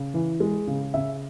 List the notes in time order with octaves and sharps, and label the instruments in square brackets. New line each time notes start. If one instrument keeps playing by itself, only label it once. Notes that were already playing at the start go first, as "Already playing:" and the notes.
Already playing: [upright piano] C#3
E3
G#3
C#3
C#3 E5